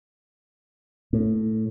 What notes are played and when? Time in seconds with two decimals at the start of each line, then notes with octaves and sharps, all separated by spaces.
1.13 A2